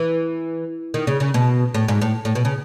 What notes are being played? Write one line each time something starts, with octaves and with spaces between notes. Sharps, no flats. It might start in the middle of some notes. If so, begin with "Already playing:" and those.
Already playing: E3
D#3
C#3
C#3
B2
A2
G#2
A2
A2
B2
C#3